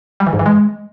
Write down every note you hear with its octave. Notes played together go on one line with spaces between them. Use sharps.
G3
E3
G#2
E3
G#3